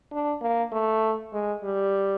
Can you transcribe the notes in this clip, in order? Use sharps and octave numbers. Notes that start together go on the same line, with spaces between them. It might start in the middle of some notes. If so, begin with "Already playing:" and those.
D4
A#3
A3
G#3
G3